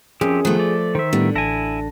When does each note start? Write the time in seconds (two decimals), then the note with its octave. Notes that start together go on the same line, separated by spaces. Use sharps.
0.21 F#2 F3 C4 G4 G#4
0.45 D#3 F3 A3 B3
0.60 D5
0.95 D#3 C5 E5
1.13 A2 D3 G3 B3
1.35 A1 E4 G#5 A5 A#6